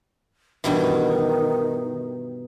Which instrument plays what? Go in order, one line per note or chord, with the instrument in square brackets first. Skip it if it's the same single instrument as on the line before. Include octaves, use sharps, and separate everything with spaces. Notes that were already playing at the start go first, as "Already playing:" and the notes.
[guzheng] G2 B2 E3 [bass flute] D#3